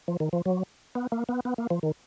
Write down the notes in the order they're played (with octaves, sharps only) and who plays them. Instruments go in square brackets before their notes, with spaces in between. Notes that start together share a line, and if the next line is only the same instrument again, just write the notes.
[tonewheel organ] F3
D#3
F3
F#3
B3
A#3
B3
B3
A#3
F3
D#3